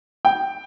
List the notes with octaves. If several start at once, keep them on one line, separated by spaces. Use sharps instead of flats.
G5